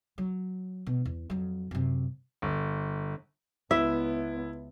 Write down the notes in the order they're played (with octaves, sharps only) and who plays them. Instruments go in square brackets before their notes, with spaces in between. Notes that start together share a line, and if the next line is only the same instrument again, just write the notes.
[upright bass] F#3
B2
E2
F2 F#3
F#2 C3
[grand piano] G1
[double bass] C#2 B3 [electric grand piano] E4 [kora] E5